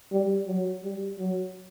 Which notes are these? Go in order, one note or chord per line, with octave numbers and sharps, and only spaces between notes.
G3
F#3
G3
F#3